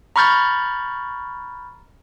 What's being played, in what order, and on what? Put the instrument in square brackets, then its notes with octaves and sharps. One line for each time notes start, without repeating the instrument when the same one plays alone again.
[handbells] A#5 B5 C#6 F6 G6 A6